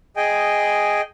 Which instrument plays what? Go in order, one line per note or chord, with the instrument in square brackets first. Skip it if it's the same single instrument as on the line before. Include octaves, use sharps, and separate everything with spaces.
[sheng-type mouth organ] G#4 D#5 G5 G#5